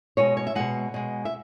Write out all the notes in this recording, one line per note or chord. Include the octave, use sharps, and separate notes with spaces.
B2 G#3 C#5
C#5
E5
B2 G#3 F#5
B2 G#3
E5